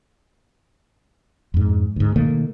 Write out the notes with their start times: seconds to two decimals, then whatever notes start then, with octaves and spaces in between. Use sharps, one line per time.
1.54 F2 G#2
1.96 D2 G#2
2.16 B2 D#3 A3 A#3